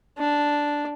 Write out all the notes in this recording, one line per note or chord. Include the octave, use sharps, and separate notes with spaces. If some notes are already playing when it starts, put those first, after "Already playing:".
D4